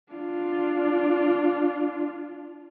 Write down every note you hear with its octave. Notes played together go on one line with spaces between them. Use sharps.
D4 F4